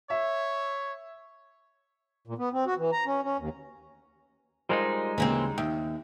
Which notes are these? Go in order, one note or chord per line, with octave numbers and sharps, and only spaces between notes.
C#5 E5
A#2
B3
C4
F#4
E3
A#5
C#4
C#4
D#2
G3 G#3 D#4 F4 A#4 C5
D2 C#3 E3 A#3 C4
D#2 E5 G5